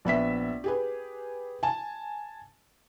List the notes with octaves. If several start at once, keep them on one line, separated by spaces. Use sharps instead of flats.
A#1 B3 E5 B6
G4 G#4 B4
G#5 A5